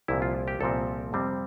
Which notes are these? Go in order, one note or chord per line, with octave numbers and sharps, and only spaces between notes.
C2 A#2 F3 C4 E4
F4
G4
C2 A#2 F3 C4 A4
F2 C3 G3 C4